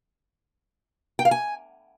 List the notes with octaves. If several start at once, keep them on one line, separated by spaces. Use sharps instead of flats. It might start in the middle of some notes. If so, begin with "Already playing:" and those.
G5
F5
G#5